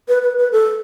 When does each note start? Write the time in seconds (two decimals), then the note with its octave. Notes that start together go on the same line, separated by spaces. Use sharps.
0.08 B4
0.22 B4
0.38 B4
0.52 A4